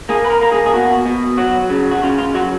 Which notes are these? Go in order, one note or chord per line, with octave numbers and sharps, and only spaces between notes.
A#3 G#4
B4
A#4
A#3 A#4
G#4
G#4
B2 F#4
B2
F#3 F#4
C#3
F#4
C#3 F4
F4
F#3 F#4